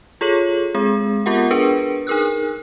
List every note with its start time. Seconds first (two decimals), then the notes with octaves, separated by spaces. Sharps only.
0.21 F4 G#4 A4 C#5 F#7
0.75 G#3 C4 G#4
1.26 B3 F4 G4 A#4 F#5
1.51 D4 G#4 A#4 B4
2.07 D#4 G#4 A#4 E6 F#6